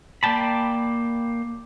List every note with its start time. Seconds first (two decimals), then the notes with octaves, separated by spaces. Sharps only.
0.23 A#3 D5 G5 A5 B5